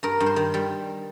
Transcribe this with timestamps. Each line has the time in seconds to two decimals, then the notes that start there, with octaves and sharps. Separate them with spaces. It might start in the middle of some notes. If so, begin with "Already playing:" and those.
0.03 G2 A#4
0.20 G2
0.26 C5
0.36 D#3
0.54 G3